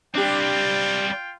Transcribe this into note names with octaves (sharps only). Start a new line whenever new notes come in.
G3 C4 D4 F4 G4 G5